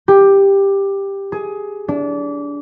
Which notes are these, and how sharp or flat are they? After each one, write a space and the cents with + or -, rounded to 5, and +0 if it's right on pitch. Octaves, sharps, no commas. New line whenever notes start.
G4 +10
G#4 +15
D4 -25